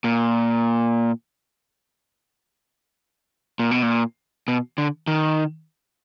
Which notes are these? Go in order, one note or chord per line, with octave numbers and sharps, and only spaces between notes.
A#2
A#2
B2
A#2
B2
D3
D#3